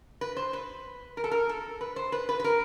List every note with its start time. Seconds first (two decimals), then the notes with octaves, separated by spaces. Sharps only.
0.21 B4
0.37 C5
0.53 B4
1.17 A#4
1.24 A4
1.31 A#4
1.49 A4
1.81 B4
1.96 C5
2.12 B4
2.29 B4
2.40 B4
2.44 A#4